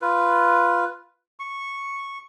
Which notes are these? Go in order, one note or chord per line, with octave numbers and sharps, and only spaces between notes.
F4 B4
C#6